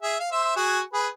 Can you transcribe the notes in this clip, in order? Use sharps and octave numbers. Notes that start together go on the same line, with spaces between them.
G#4 E5
F5
C5 E5 E6
F#4 G#4 G#5
G#4 B4